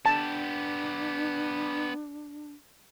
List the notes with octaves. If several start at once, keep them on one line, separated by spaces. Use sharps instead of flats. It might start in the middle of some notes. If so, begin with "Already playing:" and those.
B3 D4 G4 A5